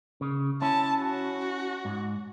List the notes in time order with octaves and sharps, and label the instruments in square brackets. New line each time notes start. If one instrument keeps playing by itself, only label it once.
[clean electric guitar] C#3
[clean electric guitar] C#4 E4 [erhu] A5
[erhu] F#4
[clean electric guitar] G#2